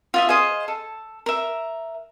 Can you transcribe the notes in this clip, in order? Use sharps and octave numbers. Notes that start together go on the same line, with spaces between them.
F4 D#5 E5
G#4 C5 D#5 F5
A4
A#4 E5